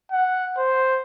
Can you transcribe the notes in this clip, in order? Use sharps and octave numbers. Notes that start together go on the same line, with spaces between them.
F#5
C5